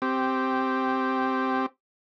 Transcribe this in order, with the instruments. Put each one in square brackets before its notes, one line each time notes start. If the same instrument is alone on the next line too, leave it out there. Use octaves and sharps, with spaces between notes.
[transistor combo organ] C4 G4